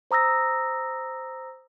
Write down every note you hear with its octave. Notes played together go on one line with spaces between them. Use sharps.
C5 A#5 D#6 E6 A#6